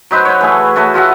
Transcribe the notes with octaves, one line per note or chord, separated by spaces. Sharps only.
F#3 D#4 B4 C5
B4 C#5
E3 A3 G#4
A3 F#4 B4 C#5
F4 F#4 E5 F#5